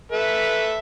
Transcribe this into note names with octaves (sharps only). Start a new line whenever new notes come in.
A4 B4 E5